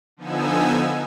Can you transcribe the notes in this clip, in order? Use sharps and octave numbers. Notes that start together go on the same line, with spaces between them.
D3 F3 B3 D#4 G#5 E6